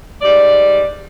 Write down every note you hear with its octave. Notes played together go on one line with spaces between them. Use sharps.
G#2 G3 D5